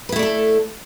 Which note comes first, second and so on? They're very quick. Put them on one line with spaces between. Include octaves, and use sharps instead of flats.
B4 E4 A3 D5 A4